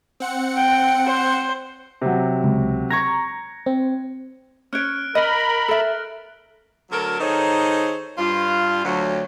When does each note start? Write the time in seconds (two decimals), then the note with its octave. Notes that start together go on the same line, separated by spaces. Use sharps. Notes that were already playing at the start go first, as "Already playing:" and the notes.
0.20 C4 F#5 C#7
0.56 G5
1.06 C5
2.02 C3 F#3
2.44 C#2
2.91 A#5 C#6 G#6 A#6
3.66 C4
4.73 C#4 C#5 F6 F#6 D7
5.15 A#4 D#5 B5 F6 A#6
5.68 A4 E5
6.91 D2 F#3 A4 A#4
7.19 D#3 D#4 G#4 A4 C5 C#5
8.18 G2 F4
8.84 D2 F#3